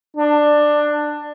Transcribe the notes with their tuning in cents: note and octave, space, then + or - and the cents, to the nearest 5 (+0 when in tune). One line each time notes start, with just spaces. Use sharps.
D4 +15